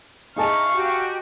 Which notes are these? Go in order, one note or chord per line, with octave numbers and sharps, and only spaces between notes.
D#4 G#4 E5 F5 A5 A#5 C#6
F#4 G4 G5